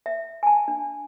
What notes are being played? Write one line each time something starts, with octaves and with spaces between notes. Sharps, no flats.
E5
G#5 A5
D4